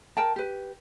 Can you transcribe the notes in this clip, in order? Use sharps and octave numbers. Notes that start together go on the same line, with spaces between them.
A#4 G5 A5
G4 B4